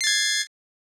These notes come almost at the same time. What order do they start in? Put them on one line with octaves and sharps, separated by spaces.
C7 A6 G#6